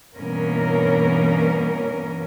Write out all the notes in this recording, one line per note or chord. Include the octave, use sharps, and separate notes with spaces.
G2 B2 E3 A#3 C#4 A#4